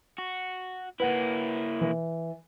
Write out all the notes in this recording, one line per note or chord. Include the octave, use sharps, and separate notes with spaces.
F#4
A#3 E4 B4 F#5
E3